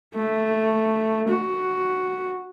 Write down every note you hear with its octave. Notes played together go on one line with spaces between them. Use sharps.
A3
F#4